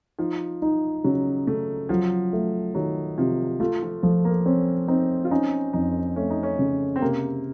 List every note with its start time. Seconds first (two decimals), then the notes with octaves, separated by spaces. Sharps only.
0.19 F3 D#4
0.62 D#4
1.04 C#3 F#3
1.47 C#3 A3
1.89 F3 F#3
2.33 A3
2.75 D#3 F#3
3.18 C3 F3
3.60 A3 F4
3.82 F3
4.03 F3 A3
4.25 A#3
4.46 C4 C#4
4.88 C4 D#4
5.25 F4
5.31 C#4 D#4
5.73 F2 D#4
6.16 A3 C#4
6.30 D#4
6.43 C#4
6.59 C#3
6.96 C4
7.02 C3 A#3